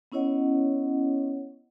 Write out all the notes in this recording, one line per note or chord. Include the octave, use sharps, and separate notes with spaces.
B3 C#4 E4 C#5 D#5 F#5